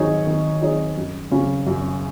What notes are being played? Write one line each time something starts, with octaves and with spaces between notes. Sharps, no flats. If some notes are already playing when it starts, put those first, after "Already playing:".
Already playing: D#3 F#3 D#4 G#4 C#5
D#3
F#3 D#4 G#4 C#5
F#2
C#3 F#3 C#4
F#2